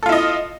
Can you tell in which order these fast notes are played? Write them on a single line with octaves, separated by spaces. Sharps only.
A4 F4 E4 D#5